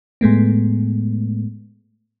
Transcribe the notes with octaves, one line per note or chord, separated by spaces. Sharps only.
A2 G#3 A3 B3